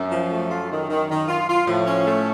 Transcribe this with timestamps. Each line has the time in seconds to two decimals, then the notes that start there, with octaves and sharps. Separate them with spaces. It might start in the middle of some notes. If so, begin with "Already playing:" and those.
Already playing: F#2
0.12 F3
0.31 A3
0.50 F4
0.70 D#3
0.90 D#3
1.09 D#3
1.28 F4
1.49 F4
1.67 A2 F3
1.86 C#4
2.06 A3